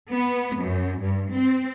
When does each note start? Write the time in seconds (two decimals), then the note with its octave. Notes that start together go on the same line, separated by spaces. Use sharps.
0.11 B3
0.61 F#2
1.01 G2
1.32 C4